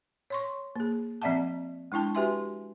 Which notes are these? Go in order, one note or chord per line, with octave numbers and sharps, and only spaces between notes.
C#5 C6 C#6
A#3 G#4
F3 C4 D5 E5 F#5 A5
G#3 D4 E4 G5 A5
F#4 G4 B4 E5 G#5 C6